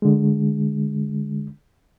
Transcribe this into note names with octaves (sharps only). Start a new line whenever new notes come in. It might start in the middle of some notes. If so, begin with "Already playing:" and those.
D3 G#3